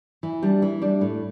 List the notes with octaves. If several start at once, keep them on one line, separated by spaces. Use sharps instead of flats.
E3
G3 D4
E3
G3 D4
A2